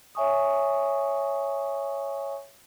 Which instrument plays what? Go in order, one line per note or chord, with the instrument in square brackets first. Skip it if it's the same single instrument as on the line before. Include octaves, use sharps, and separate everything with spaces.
[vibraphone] C#5 E5 G#5 C#6 D#6